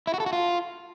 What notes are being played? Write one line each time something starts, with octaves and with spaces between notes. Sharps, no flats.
E4
F#4
A4
F#4
F4